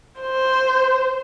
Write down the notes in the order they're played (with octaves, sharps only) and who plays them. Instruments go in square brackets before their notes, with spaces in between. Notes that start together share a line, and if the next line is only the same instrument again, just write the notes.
[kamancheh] C5